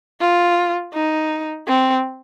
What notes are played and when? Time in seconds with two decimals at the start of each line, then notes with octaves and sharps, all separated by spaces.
0.21 F4
0.93 D#4
1.67 C4